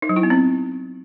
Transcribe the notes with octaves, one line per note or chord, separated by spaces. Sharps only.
D#4
F#3
E4
B3
C4